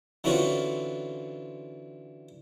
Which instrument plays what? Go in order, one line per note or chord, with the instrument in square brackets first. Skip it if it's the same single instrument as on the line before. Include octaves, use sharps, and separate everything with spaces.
[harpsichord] D3 E3 C4 C#4 F4 F#4